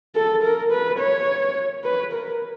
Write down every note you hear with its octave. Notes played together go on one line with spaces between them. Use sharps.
A4
A#4
B4
C#5
B4
A#4